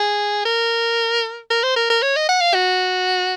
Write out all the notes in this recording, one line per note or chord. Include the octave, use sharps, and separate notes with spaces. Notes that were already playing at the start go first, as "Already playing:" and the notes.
Already playing: G#4
A#4
A#4
C5
A#4
A#4
C#5
D#5
F#5
F5
F#4